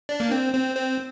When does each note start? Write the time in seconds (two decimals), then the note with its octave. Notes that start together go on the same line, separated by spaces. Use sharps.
0.09 D4
0.20 A#3
0.32 C4
0.54 C4
0.76 C4